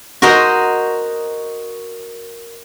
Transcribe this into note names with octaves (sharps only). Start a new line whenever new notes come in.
F#4 A#4 C5 D#5